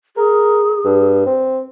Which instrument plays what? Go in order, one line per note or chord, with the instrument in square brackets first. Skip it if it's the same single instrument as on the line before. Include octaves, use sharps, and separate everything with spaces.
[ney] G#4 [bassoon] A#4
[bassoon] G2
C4